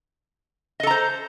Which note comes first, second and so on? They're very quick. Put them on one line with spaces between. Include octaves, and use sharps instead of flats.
D#5 A4 A#5 C5